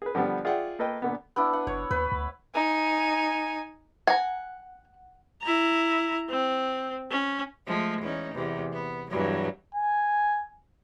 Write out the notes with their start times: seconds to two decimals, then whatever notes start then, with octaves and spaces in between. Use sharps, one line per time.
0.02 G#4 B4
0.15 D3 F3 G3 B3
0.45 F4 G#4 D5 E5 F#5 G5
0.79 A#3 A4 B4 D#5 G5
1.02 A#2 D3 B3
1.36 B3 D4 E4
1.53 F#5
1.67 F#1 C#5
1.91 D#2 B4
2.12 D2
2.55 D#4 G#5
4.07 F#5 G#5 A#5
5.43 E4 A#5
6.29 C4
7.11 C#4
7.66 F3 G#3 A3
8.02 E2 C#4 D#4
8.34 E2 C3
8.73 B3
9.10 E2 G2 F#3
9.75 G#5